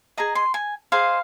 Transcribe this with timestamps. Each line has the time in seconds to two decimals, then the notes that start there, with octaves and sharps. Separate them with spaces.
0.17 G#4 D#5 A#5
0.35 C6
0.54 G#5
0.92 G#4 C5 D#5 F5